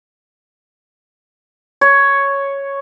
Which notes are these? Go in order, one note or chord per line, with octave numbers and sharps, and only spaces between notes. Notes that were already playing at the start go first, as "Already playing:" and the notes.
C#5